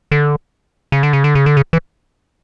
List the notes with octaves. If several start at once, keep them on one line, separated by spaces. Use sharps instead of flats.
D3
C#3
D3
C#3
D3
C#3
D3
C#3
E3